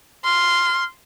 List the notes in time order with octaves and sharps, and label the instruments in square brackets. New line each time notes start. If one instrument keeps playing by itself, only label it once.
[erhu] C6 [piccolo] F6